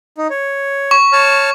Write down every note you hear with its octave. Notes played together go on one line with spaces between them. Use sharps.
D#4
C#5
C#6
C#5 A5 F6